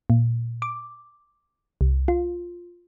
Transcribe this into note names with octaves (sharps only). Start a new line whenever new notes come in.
A#2
D6
C2
F4